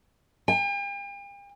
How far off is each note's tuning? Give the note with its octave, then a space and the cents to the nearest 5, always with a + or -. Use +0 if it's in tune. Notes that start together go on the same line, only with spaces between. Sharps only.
G5 +45